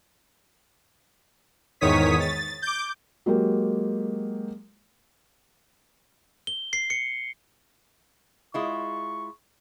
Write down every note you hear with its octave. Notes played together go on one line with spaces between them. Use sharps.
E2 G#2 D#3 C#5 D#6 B6
A6
D6 G6
F#3 G#3 A#3 G4
G7
C7
C#7
G#3 E4 F4 C#6